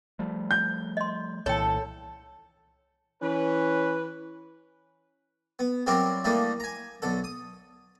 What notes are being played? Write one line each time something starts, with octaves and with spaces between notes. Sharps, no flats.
F3 G3 A3
G6
D#5 C6
C2 A#2 E3 A4 C#5 G5
E3 C#4 B4
B3
F#3 G3 C4 E4 G4 A#4
E3 G3 A3 A#3 D4 D#4
G#5 A#5
B1 D3 A4
D#6